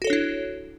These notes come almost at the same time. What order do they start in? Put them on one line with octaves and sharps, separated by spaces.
F#4 A4 C#5 D4 E4